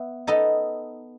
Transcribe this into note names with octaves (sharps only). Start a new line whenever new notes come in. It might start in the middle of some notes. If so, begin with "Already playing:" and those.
Already playing: B3 E5
B3 D#4 A4 D#5